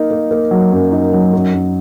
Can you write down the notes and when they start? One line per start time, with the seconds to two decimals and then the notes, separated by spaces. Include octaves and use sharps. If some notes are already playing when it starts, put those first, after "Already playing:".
Already playing: A#3 D#4
0.11 A#3
0.31 A#3
0.51 F#3
0.72 F#2
0.92 D#4
1.13 F#3
1.33 F#2
1.54 F#2